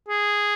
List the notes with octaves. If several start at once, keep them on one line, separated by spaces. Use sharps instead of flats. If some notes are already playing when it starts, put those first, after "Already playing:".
G#4